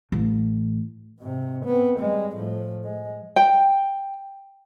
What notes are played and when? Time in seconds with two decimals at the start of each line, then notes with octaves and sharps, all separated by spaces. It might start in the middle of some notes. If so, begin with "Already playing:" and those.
0.12 A1
1.19 G#2 C3
1.65 B3 C4
2.00 G3 G#3
2.34 A2 F3
2.84 G#3
3.36 G5